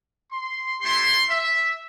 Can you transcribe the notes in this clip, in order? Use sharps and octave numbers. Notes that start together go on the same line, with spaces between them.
C6
A3 E4 G4 C6
E5